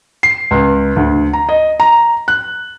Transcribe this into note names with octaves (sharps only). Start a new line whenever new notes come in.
C7
C#2
D2
A#5
D#5
A#5
F#6